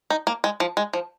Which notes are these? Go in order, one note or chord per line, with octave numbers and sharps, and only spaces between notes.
D#4
A#3
G#3
F3
G#3
F3